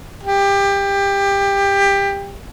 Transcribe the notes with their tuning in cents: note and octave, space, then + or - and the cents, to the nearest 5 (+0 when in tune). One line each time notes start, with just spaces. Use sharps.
G4 +20